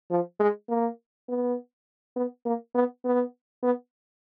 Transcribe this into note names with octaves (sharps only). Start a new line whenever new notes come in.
F3
G#3
A#3
B3
B3
A#3
B3
B3
B3